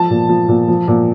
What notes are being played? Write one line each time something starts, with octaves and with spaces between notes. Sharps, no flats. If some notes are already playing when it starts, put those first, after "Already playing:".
Already playing: F3 A5
A#2
F3
A#2
F3
A#2